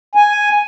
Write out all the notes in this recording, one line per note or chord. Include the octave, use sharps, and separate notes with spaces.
G#5